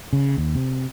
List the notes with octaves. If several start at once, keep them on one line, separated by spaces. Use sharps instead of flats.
C#3
D#2
C3